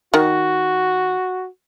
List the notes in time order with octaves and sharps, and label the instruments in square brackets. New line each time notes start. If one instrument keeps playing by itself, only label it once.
[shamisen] D#3 [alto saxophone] F#4